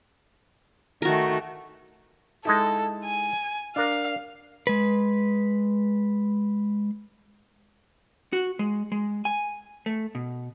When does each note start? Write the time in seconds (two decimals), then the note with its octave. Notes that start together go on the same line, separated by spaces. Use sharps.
1.02 D#3 A3 F#4 A#4
2.45 G#3 D#4 E4 A4
3.04 G#5
3.76 D4 A#4 F5
4.67 G#3 B4
8.33 F#4
8.59 G#3
8.92 G#3
9.25 G#5
9.86 A3
10.15 B2